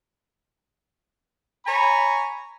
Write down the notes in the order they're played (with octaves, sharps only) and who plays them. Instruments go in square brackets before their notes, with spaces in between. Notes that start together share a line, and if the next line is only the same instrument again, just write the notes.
[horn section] C#5 G#5 A#5 B5